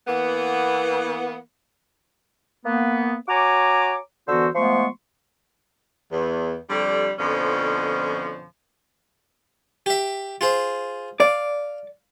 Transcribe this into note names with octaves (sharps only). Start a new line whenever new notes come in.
E3 A#3 B3
A#3 B3
F#4 C#5 G#5 A#5 D6
D3 E3 B3 F#4 C5 E6
F3 G#3 A3 B3 C6 C#6
E2
F2 D3 G3
F2 B2 D3 F3 C#4
G4 E5
F4 G#4 C5
D5 F5